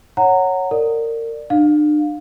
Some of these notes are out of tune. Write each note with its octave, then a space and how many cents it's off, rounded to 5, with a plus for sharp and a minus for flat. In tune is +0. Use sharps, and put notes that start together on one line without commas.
C#5 -5 F#5 +0 A#5 -20
A#4 -30 D5 +10
D4 +40 F5 +20